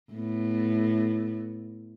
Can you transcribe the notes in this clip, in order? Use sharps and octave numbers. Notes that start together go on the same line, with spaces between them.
A2 B3